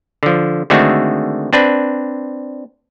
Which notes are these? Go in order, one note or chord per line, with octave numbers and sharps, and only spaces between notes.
D3 F3
D3 D#3 G#3 A3 C4 F#4
C4 D4 B4